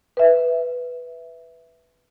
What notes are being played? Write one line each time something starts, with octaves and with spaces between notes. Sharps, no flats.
B4 E5